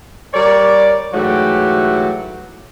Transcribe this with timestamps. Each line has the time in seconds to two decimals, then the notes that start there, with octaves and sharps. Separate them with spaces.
0.34 G3 A#4 C#5 D5
1.14 G#2 E3 F#3 A3 F#4 G4